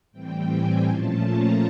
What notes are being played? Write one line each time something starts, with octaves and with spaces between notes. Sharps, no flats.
A2 E3 G3 C4 G5
G#5
A#2 F3 A3 C#4 F4 A5
A#5